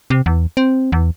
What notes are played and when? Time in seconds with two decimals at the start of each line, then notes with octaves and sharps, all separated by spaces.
0.10 C3
0.26 E2
0.57 C4
0.92 E2